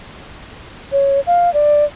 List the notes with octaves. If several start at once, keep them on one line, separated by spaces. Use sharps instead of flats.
C#5
F5
D5